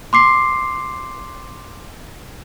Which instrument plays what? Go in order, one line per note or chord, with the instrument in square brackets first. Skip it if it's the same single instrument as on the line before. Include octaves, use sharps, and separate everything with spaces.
[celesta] C6 D6 C7